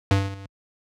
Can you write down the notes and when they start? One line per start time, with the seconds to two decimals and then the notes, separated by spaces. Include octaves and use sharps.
0.11 G2